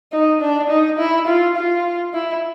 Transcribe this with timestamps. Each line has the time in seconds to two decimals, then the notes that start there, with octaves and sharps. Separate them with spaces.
0.12 D#4
0.41 D4
0.70 D#4
0.99 E4
1.27 F4
1.57 F4
2.14 E4